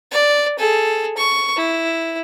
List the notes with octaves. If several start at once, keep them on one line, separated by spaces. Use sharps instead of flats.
D5
G#4 A4
C#6
E4